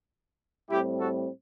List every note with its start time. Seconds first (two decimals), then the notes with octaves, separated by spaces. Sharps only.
0.70 A2 G3 C4 E4 G4
0.98 F#4 A4